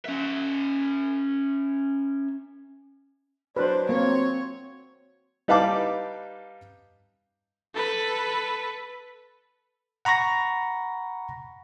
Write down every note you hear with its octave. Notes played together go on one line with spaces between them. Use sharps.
C#4 E5
F#3 D4 B4 C5
A#3 C4 C#5
G3 D#4 B4 F5 A5 D6
A4 B4
F#5 A#5 B5 C#6 A#6